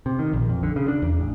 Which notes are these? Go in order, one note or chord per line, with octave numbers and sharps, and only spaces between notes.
C3
D#3
A#1
F2
D3
C#3
D4
E2
A1